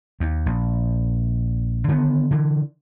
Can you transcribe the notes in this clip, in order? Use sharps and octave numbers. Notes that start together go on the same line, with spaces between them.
D#2
A#1
D3 D#3 A3 B3
D3 E3